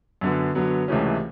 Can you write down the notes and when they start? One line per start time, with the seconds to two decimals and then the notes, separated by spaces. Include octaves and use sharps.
0.21 F#2 D3 F#3 B3
0.55 F#2 D3 F#3 B3
0.88 C#2 C3 E3 A3 C#4